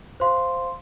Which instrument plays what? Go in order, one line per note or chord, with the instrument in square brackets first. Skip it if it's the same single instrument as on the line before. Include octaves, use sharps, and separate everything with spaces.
[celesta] C5 F5 C6